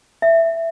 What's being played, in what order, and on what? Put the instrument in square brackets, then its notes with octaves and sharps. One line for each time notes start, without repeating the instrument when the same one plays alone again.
[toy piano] E5